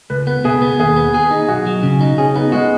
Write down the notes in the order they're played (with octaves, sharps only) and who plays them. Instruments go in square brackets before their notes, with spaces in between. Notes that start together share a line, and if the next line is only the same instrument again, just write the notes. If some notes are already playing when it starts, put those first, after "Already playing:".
[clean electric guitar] C#2 [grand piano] B4
[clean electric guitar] B3 [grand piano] B4
[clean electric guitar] B2 [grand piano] G#4
[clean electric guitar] B3
[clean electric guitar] D#2 [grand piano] G#4
[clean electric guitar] B3
G#4
D#4
[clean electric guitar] B1 [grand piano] F#4
[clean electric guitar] F#3
C#3
D#4
[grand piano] C#4 [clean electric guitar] G#4
[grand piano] B3 [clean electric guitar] D#4
[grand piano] G#3 [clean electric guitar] F#4